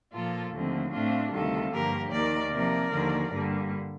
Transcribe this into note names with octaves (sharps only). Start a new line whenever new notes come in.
A#2 F3 A#3 F4 A4
D#2 D3 F3 A3 C4
A2 A3 C4 D4 F4
D2 C3 D#3 G3 F4 A4
G2 D3 F3 A#3 G4 A#4
D#2 D#3 A#3 A#4 D5
C3 F3 A#3 A#4 D5
D#2 D3 F3 A#3
G2 D3 G3 A#3